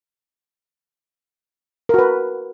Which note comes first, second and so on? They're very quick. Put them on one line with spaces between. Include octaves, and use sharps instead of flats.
A#4 F#4 B4